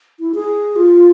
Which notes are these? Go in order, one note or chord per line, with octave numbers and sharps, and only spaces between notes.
E4
G#4
F4